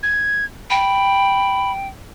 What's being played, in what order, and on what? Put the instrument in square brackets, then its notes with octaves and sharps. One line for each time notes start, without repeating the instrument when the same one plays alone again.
[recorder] G#6
[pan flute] G5 [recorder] B5